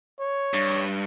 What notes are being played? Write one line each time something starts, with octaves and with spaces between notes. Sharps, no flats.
C#5
G2